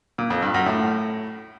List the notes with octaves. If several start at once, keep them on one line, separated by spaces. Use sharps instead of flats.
A#2
F2
G2
F#2
A2